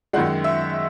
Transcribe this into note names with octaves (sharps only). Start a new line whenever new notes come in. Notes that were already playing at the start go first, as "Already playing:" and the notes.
F#2 D#3 G#3 F#5
E5